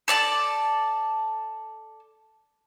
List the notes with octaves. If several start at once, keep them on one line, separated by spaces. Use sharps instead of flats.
A4 D5 A5